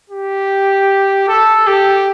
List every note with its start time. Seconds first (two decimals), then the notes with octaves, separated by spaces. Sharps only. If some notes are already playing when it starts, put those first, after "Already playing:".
0.10 G4
1.28 A4
1.67 G4